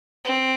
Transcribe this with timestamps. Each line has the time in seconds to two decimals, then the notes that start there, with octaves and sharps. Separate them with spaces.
0.25 C4